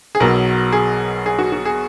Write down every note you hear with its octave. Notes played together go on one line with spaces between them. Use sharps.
G#4
B1 B2 F#3 A#4
G#4
G#4
F#4
F#4
G#4